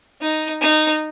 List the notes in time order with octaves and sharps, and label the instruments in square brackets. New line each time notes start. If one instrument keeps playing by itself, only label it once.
[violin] D#4
D#4